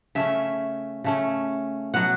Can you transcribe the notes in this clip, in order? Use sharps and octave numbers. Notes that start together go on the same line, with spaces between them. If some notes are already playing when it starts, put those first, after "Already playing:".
C#3 A3 C#4 E5
C#3 A3 C#4
B2 F#3 B3 F#5